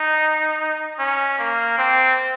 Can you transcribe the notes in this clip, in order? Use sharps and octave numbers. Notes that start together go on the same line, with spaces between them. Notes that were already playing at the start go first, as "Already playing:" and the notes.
Already playing: D#4
C#4
A#3
C4